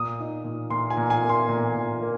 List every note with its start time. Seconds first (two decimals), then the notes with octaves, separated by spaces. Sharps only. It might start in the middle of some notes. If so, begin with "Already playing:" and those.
Already playing: A#2 D#6
0.19 D#4
0.44 A#2
0.70 A#2 C6
0.90 G#5
0.97 A#2
1.10 G#5
1.23 A#3
1.29 C6
1.49 A#2
1.75 A#2
2.01 A#3